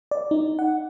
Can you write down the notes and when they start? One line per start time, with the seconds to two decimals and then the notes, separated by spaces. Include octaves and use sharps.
0.11 D5
0.31 D#4
0.59 F#5